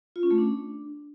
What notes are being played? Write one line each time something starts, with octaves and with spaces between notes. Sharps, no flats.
F4
C#4
A3
D4